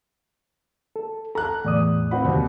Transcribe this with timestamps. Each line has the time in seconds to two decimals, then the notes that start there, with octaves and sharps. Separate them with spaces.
0.96 A4
1.35 A4 A#5 F#6
1.65 E2 A2 D5 D#6
2.11 C4 F#4 B5
2.24 D#2 C3